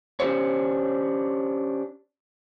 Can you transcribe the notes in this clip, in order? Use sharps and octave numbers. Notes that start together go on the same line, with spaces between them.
C#4 D4 G4 C5 C#5